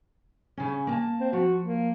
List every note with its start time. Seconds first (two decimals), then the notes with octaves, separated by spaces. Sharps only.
0.57 C#3 C#4
0.87 A#3 G#5 A5
1.20 C4
1.33 F3 F#4
1.64 A#3